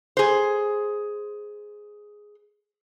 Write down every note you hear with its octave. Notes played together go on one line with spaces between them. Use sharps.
G#4 C5